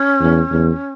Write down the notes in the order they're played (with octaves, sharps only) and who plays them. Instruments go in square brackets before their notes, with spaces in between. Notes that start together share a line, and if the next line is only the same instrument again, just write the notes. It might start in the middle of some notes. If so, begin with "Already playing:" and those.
Already playing: [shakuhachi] C#4
[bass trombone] E2
E2